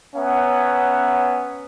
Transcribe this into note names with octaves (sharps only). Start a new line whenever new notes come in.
B3 C#4 E5 F#5 A#5